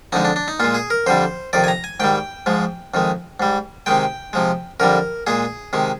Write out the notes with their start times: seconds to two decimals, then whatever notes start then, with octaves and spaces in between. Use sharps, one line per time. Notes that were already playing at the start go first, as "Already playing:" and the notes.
0.12 F2 D3 G#3 D#4
0.25 D4
0.36 D4
0.48 D#4
0.60 A#2 G#3 F4
0.74 G#4
0.90 A#4
1.06 F2 D3 G3 C5
1.53 F2 C3 D#3 D5
1.64 G#5
1.68 A#5
1.84 G#5
2.00 G#2 D#3 G3 G5
2.46 G#2 F3 G#3
2.94 F2 D#3 G#3
3.40 G#2 G3
3.86 C3 D#3 G#3 G5
4.33 C3 F3 G#3
4.80 F2 D3 G3 A#4
5.27 A#2 G#3 G#4
5.73 C3 D#3 G#3